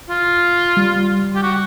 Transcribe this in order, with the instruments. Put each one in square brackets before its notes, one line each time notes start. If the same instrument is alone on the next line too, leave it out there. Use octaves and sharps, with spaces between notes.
[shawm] F4
[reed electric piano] G3
[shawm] G4
F#4